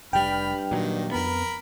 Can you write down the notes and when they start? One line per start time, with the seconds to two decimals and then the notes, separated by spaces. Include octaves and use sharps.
0.13 F1 G2 G3 G5 B5 F6
0.71 A#2 D#3 F#3
1.11 F2 B3 A#4 B5